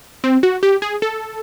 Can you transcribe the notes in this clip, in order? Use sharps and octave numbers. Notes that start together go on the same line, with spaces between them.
C4
F#4
G4
G#4
A4